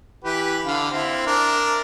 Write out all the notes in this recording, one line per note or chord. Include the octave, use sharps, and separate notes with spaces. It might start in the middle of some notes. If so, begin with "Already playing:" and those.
E3 G4 B4
D3 F5
C4 E4
D4 A#4